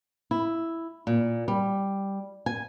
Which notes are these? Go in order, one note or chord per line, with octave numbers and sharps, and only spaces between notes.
E4
A#2
G3
G#5